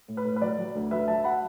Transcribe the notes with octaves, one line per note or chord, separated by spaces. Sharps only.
A2
B4
A2
B4
F#3 D5
F#3
D2
F#3 B4 E5
F#3 E5 A5
F#5 B5